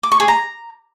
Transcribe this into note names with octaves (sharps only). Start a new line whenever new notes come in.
D6
C#6
G#4
A#5